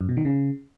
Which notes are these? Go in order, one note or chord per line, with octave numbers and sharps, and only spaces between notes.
F#2
B2
D#3
C#3